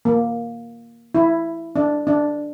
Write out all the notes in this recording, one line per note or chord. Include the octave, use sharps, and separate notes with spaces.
A#3
E4
D4
D4